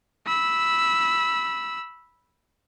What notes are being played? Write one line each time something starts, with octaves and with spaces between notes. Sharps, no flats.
B5 E6